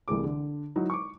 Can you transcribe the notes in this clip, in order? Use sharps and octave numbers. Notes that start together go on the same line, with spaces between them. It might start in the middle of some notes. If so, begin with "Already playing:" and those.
C2 E3 A3 G#4 D6
D3
F#3 D#4 E4
C#6 D6